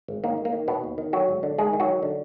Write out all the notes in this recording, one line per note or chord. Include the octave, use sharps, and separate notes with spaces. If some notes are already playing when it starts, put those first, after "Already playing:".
G#1
D#3 A#3
D#3
A#3
D#3
B2 D#3 B3
D#2
D#3
D3 F#3 F#4
G#1
D3
D#3 G#3 G#4
D#3
F#3 F#4
D#3
D3